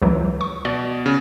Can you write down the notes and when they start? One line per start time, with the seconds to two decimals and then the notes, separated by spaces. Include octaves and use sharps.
0.02 C#2 E3 F#3
0.41 C#6
0.65 B2 D5
1.06 C#3